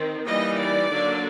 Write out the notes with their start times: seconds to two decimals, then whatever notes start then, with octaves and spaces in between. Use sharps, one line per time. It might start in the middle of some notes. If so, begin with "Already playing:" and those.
Already playing: D#3 C4
0.26 E3 G3 A#3 D#4 D#5
0.59 D5
0.89 D3 F#3 A#3